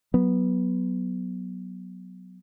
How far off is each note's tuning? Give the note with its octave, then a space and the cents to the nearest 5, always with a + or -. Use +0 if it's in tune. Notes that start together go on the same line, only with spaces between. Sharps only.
F#3 +0 B3 -5